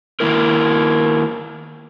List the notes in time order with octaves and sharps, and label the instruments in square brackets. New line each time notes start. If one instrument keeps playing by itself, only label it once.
[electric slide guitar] D#3 A#3 E4 A#4